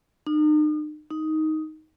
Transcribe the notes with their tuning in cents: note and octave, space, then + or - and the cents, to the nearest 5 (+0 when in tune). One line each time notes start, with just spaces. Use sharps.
D#4 -40
D#4 +10